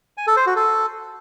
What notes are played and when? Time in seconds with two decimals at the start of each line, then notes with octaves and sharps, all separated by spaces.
0.17 G#5
0.27 A4
0.37 C5
0.46 F#4
0.56 A4